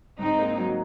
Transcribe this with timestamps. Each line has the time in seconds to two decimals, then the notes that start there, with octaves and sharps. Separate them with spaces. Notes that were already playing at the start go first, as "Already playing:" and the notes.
0.19 G#2 C4 D#4
0.39 A#3
0.57 F#3